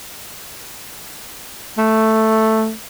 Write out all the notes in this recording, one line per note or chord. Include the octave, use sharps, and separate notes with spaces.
A3